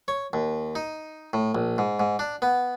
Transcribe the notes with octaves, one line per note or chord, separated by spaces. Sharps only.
C#5
D#2
D#4
A2
A#1
G#2
G#2
D4
B3